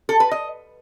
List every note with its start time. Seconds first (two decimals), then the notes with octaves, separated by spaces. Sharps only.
0.09 A4
0.20 B4
0.31 D#5